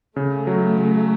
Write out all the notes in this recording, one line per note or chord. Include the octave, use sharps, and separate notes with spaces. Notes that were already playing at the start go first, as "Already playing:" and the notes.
C#3 A3
F#3
C#3